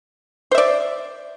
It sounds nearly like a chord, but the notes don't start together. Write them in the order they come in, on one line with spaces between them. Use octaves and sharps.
C5 E5 D5